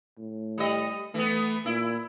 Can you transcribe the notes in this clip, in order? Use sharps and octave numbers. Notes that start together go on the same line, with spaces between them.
A2
G3 D#5
E3 A3 B3
A#2 E4